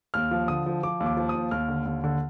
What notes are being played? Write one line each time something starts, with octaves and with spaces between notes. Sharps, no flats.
D#2 F6
F3
D3 D#6
F3
F3 D6
D#2
D6
F3
D#6
D#2
D#2 F6
D3
D#2
D3